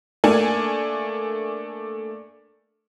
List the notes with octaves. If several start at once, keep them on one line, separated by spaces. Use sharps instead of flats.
A3 A#3 D4 G#5